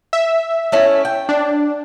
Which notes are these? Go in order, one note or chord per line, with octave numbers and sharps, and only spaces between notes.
E5
A3 C#4 E4
G5
D4